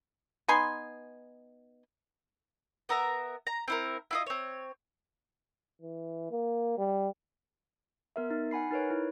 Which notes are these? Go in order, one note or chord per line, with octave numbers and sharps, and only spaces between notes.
B3 D#4 G#5 C6
B3 A#4 E5 A#5
A#5
C4 E4 A#4
E4 F4 D#5
C4 C#5
E3
A#3
G3
B3 A#4 E5
D#4
F#5 G#5 B5 C7
D#4 A#4 B4 C#5
E4